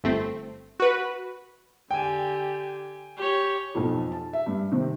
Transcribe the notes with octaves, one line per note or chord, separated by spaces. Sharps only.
G1 A3 C4
F#4 B4
D3 G4 G5 G#5
G4 C#5
B1 F2
A5
E5
G2
C3 D#3 C4